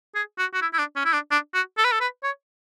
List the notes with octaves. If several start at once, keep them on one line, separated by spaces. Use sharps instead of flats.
G#4
F#4
F#4
E4
E4
D4
C#4
E4
D4
D4
F#4
A4
B4
A4
B4
C#5